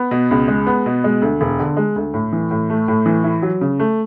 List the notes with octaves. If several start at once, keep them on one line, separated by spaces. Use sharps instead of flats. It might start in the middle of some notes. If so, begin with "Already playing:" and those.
Already playing: B3
B2
C#2
G#3
B3
B2
G#3
D2
E1
D3
G#3
D2
A2
E3
A2
A3
A2
E3
E4
F#3
C#3
A3